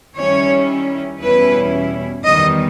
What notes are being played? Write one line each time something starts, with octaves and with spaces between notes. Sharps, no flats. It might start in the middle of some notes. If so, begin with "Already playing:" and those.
D#3 G3 C#4 E4 C#5
E2 B2 G3 C#4 E4 B4
E2 D#3 G3 B3 D#5